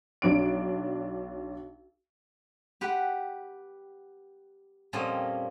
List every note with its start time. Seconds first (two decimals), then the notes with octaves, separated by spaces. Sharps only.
0.22 B1 D4 D7
2.81 G4 B4 F#5
4.93 F2 A#2 F3 G3 C#4 D#5